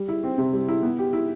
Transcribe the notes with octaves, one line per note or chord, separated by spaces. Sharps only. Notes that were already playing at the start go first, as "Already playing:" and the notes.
Already playing: G3
E4
C4
C3
G3
E4
B3
G4
E4